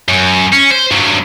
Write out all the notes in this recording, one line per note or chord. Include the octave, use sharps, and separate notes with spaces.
F#2
C#4
C5
G2 F#3